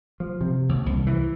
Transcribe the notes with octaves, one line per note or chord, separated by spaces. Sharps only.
F3
C3
D#2
C2
E3